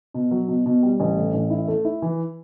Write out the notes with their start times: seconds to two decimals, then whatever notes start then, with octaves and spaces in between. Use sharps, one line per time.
0.14 B2
0.31 F#3
0.48 B2
0.66 B2
0.83 G3
1.00 A1
1.17 A2
1.34 A1
1.50 E4
1.68 A3
1.85 E4
2.02 E3